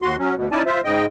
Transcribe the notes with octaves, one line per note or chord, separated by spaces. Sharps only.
D#2 F#4 C6
F#3 C#4
D2 B2
C#4 D#4 E4 D5 G#5 A5
F4 C5 E5
G#2 C#3 D#5 G5